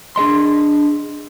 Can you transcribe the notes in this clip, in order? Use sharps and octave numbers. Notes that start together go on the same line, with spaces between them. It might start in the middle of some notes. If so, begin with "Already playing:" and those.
D4 G#4 D#5 C6